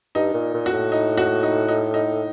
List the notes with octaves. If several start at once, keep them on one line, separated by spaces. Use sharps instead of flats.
G2 D#4
A#2
A#2
F#4
A2
D#4
F#4
D#4
D#4
D#4